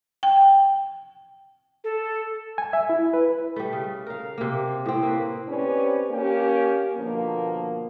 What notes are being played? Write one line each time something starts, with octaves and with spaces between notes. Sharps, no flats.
G5
A4
G#5
E5
E4
B4
G3 A3
C#3
A#4 F5
C3 A#3
A2 C4
A#3 B4
C4 C#4 G4 B4 C5 D5
A#3 C#4 G4
B2 D3 F3 A#3